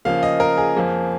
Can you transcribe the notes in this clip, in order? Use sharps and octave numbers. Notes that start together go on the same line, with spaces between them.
C#3 F3 A#3 F5
D#5
A#4
G#4
F2 F3 A#3